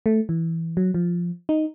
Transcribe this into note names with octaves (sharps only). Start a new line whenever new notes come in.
A3
E3
F#3
F3
D#4